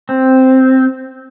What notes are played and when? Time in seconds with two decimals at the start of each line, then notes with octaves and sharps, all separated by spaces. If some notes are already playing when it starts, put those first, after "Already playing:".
0.09 C4